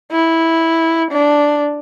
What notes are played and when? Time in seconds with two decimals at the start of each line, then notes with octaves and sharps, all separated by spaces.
0.12 E4
1.12 D4